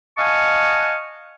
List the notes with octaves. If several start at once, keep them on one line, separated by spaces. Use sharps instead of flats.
D#5 F5 F#5 G#5 A5 C#6